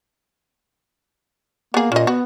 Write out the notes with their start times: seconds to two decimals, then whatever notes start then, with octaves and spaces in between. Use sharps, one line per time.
1.74 A#3 B3 G#4
1.92 A#2 C#4 D#5
2.07 B3 F#4